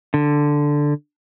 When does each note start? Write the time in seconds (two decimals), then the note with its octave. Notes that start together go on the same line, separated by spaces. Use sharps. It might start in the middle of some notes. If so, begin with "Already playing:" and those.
0.14 D3